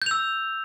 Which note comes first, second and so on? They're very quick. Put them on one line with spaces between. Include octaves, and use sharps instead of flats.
G6 F7 E6